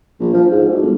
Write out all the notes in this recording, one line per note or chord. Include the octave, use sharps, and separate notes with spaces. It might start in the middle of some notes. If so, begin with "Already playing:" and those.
A#1
F3
G#2
D2
G1